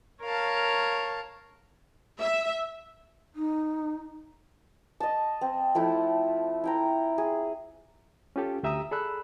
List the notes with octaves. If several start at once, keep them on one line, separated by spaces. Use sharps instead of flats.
A#4 C#5 F5 A5
E5
D#4
D#5 A5
C4
F3 A3 E4 G5
E4 G5 A#5
G#4
C#4 F4 G4 A4
D2 G4 E5 A#5 D#6 E6
G#4 A4 D5 B5 E6 F#6